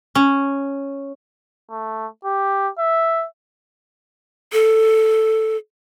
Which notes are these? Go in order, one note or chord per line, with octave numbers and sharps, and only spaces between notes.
C#4
A3
G4
E5
A4